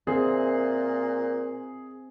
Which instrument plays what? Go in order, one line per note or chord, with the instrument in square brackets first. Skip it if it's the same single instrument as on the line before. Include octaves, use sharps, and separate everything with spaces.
[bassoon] A#2 [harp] C4 E5 [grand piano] G#4